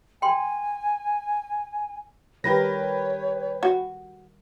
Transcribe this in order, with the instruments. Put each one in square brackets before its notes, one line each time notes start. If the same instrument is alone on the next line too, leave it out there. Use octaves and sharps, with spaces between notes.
[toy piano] G5 C6 [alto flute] G#5
[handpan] D#3 G3 A#4 [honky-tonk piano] G4 B4 A#6 [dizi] C#5
[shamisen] F#4